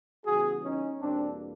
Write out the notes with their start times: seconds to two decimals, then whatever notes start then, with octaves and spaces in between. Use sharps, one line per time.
0.26 C#3 E3 G3 B3 F#4 G#4
0.63 C#4 D#4
1.00 E2 B2 G3 A#3 C4 D4